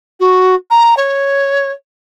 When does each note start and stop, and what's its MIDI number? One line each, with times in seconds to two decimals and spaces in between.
0.20 0.55 66
0.71 0.95 82
0.97 1.72 73